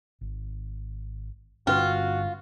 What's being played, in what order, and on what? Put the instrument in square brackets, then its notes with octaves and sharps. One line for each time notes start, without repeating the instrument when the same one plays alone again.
[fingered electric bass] G#1
[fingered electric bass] G2 D3 G3 [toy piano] C#4 B4 E6 [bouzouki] F4 [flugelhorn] F#4